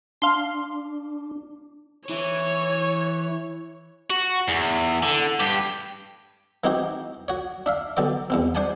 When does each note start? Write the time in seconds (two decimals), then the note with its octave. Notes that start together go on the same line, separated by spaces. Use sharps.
0.22 D4 F5 C6
2.09 E3 C#5
4.10 F#4
4.48 E2
5.03 D3
5.40 G2 G4
6.64 E3 G#3 C4 D#4 F#4 G4
7.28 F#4 C#5
7.66 D4 E5 F5
7.97 B2 D3 F#3 D5 D6
8.30 E2 B2 C4
8.55 D4 C5 D5 F#5 G#5 A5